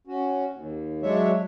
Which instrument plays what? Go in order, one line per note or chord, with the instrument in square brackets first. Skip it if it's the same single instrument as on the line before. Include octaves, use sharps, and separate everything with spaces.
[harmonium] C#4 F#4
D#2
F#3 G#3 D4 C#5 E5